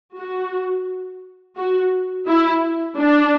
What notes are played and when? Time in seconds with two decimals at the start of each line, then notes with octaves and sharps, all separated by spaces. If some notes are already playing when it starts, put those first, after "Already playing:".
0.16 F#4
1.57 F#4
2.27 E4
2.97 D4